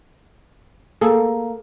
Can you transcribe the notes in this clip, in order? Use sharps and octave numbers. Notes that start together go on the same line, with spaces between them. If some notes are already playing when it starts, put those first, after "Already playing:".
A#3 G#4 A4